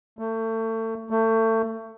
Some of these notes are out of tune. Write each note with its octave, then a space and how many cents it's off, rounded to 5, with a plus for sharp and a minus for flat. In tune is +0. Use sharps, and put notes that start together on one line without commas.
A3 +30
A3 +30